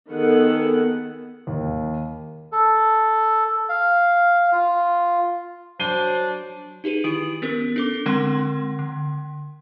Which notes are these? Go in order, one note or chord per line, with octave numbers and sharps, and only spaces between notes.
D#3 B3 G#4 A4 F#5
D#2
A4
F5
F4
F#3 D4 C5 C7 D#7 G7
D#4 G4 G#4 B4 D#7
D#3 E4 G4 D#6 D7 F#7
B3 C#4 A#4
D4 A4 D6
D3 G#3 C4 A#4 F#5 C6
D3